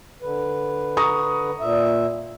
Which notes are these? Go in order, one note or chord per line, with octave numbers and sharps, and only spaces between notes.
D3 B4
A#5 C#6 D#6
A#2 E5